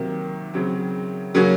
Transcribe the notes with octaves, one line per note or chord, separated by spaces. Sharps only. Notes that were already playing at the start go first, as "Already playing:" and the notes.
Already playing: C3 D#3 F#3 A#3
C#3 F#3 C4
C#3 F#3 A#3 C#4 F#4